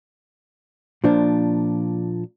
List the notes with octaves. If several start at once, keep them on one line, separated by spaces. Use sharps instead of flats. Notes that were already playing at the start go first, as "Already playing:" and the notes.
A#2 F3 D4